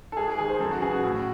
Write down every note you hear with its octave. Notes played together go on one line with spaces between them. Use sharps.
A4
G#2 G#4
G#4
D#3 G#4
C5
F#2 A4
F#4
C#3 E3 G#4
F#4
A2 F#4